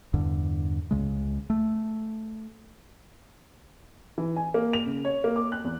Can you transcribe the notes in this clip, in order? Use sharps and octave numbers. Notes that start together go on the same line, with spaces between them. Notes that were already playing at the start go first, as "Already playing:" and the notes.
E2 G2 D3
C#2 C#3 G#3
A3
E3
G#5
A#3
F7
C#3
C#5
A#3
D6
F#6
E2